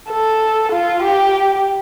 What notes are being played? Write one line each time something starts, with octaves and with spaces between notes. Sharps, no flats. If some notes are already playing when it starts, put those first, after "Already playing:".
A4
F4
G4